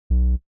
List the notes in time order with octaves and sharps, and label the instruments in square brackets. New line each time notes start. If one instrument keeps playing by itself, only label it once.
[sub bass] B1